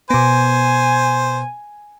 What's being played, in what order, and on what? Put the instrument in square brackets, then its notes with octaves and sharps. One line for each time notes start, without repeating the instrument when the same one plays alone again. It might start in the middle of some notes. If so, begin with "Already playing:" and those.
[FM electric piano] B2 B3 [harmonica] C5 [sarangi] G#5